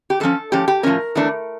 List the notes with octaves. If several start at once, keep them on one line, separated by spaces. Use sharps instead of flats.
G4
A2 F3 C#4 A4
A2 F3 C#4 G4
G4
A2 F3 C#4 A#4
E2 E3 A3 D4